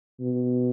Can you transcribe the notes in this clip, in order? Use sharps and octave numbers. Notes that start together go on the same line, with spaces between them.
B2